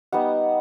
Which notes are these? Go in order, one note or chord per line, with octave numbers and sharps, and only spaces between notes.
G3 B3 D#4 F#5